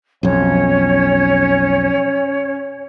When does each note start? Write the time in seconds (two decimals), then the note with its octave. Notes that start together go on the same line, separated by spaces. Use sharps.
0.23 B1 F2 C#4 C#5